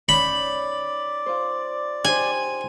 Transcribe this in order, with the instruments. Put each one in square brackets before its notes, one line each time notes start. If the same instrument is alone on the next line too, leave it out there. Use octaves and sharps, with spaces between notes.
[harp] C#4 D#4 G6 [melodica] D5 [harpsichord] B5
[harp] F4 C5
[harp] D#4 G4 C5 [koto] G#5